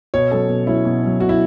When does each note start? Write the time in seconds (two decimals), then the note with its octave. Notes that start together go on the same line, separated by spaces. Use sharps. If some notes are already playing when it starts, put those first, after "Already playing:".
0.14 B2 C#5
0.31 F#3 C#4 A4
0.49 B2
0.67 F#3 C#4 E4
0.85 B2
1.02 F#3 C#4
1.20 B2 F#4
1.29 E4